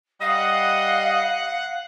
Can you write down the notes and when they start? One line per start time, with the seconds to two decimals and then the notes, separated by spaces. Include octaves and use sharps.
0.21 G3 D#5 F5 F#5